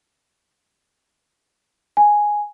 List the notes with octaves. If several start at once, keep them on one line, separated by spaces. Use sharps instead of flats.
G#5